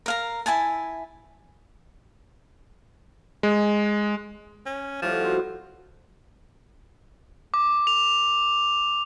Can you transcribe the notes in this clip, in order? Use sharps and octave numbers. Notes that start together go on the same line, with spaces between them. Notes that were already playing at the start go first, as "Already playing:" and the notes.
A#4 F5 A#5
E4 E5 G#5 A5
G#3
C#4
A2 F3 G3 F#4
B2 C4
D6
F7